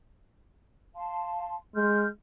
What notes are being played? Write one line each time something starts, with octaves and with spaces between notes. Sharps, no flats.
F5 A5 C6
G#3 C6 F6 G6